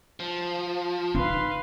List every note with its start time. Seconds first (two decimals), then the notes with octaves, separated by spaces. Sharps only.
0.20 F3
1.15 D#4 B4 F5 C6